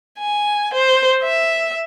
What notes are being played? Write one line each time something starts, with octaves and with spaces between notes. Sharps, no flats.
G#5
C5
E5